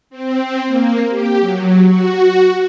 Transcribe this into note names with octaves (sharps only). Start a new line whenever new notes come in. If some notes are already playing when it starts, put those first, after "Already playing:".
C4
A#3
G4
F#3
F#4